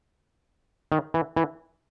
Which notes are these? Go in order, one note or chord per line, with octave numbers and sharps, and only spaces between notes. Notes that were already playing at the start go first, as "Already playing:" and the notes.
D#3
E3
E3